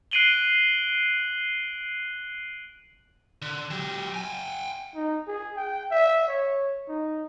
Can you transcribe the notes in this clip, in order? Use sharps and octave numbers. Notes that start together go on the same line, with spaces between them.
F#6 C7 D7 D#7 F#7 G7
D3
F#3 G4
G5 G#5
D#4
G#4
G5
E5
C#5
D#4